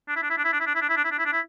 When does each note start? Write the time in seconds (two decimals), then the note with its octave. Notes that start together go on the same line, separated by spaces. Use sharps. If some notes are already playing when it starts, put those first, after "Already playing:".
0.08 D4
0.16 E4
0.23 D4
0.30 E4
0.38 D4
0.44 E4
0.53 D4
0.60 E4
0.67 D4
0.75 E4
0.81 D4
0.89 E4
0.97 D4
1.04 E4
1.11 D4
1.19 E4
1.25 D4
1.33 E4